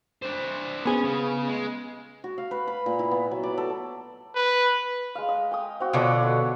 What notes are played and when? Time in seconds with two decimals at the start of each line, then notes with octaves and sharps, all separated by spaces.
0.22 D4 C5
0.85 B3 C#4 G#4
1.04 C#3
1.48 G#3
2.24 F#4
2.38 F5
2.51 B4
2.67 B5
2.86 A#2
2.99 E4
3.11 B3
3.31 F#3
3.43 D5
3.58 A4
4.36 B4
5.15 G#3 F5
5.29 D#5
5.51 G5 G#5 D#6
5.80 C4 F#4
5.93 B2 D3 F4 C#5 D5
6.22 F#4 B4